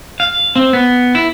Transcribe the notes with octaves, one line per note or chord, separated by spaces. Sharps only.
F5
C4
B3
E4